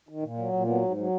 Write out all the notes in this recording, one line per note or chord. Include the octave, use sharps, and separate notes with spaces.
D#3
A#2
F#3
A#2
F#3 B3
G#2
F#3